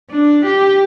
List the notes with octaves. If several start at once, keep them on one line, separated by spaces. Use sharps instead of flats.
D4
G4